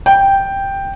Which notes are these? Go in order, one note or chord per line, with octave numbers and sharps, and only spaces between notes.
G5